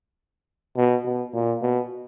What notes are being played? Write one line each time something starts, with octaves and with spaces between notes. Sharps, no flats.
B2
B2
A#2
B2